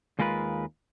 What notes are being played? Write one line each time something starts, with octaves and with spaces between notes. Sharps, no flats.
D#2 G#3 F4 A#4 B4